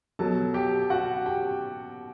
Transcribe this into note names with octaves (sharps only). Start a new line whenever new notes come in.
B2 F#3 A4 A5
G4 G5
F#4 F#5
G4 G5